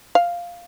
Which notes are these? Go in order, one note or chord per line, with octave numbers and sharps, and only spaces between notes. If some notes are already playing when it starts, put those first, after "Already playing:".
F5